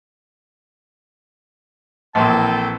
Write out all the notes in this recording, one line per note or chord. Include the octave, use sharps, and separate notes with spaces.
A#1 E3 A#3 C4 A4 C5 A5